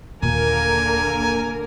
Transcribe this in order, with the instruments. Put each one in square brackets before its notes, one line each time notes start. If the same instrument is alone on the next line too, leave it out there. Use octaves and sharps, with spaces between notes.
[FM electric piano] D#2 [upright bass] A#2 [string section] D3 A#3 A#4 [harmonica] G#5